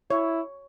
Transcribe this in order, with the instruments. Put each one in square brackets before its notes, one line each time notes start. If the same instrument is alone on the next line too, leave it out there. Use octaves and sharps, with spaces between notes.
[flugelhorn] E4 [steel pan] C#5